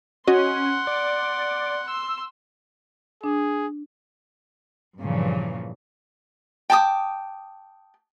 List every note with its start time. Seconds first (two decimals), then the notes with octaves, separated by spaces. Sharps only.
0.27 C#4 F#4 D#5 F#5 C6 D#6
0.87 D5
1.88 C6 E6
3.24 D4 G#4
4.99 G2 A#2 C#3 E3 F3
6.70 G5 A5 D6 D#6